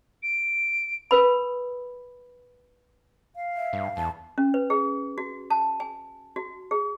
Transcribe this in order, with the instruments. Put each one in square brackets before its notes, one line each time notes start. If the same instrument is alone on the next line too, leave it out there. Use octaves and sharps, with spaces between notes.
[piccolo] D7
[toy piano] A#4 B4 B5
[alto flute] F5
[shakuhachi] E5
[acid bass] G2
[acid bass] E2 [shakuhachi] A5
[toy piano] C#4
B4
G#4
F#4
A5
G#5
F#4
G#4